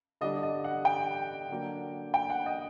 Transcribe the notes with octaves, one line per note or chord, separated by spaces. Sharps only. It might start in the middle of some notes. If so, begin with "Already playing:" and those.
D3 G3 D4 D#5
D#5
F#5
G5
D3 F#3 A#3 D4
G5
F#5
D#5